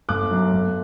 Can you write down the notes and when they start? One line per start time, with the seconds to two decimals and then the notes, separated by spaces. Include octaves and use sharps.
0.09 G1 D6 F#6
0.31 F#2 F#3
0.53 G1